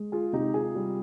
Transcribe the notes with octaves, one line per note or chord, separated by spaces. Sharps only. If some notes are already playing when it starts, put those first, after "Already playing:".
Already playing: G#3
F4 G#4
C3 D#4 G4
F4 G#4
G3